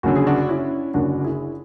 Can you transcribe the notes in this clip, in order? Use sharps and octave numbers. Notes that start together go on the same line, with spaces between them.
F#1 F#2 D3 F#4
G#4
D4 F#4
C#4 E4
F#1 F#2 D3 D4 F#4
E4 G#4